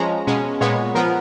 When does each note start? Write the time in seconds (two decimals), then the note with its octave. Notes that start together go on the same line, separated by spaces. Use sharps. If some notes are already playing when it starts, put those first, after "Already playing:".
Already playing: F3 G#3 C#4 A#5
0.27 B2 G#3 C#4
0.61 A#2 G#3 B3 C#5
0.95 F3 B3 A#4